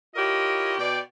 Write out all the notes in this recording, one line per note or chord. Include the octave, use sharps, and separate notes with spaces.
E4 F4 G4 A#4 C#5 D#5
B2 D5 G5